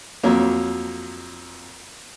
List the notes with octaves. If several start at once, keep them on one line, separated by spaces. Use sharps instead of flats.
F2 F#3 A#3